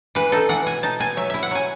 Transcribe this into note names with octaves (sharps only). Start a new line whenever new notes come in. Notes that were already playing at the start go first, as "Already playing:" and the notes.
E3 B4
D#4 A4
E3 F#5
B2 G#5
D#4 A5
B2 G#5
F#3 E5
E4 E5
F#5
F#3 G#5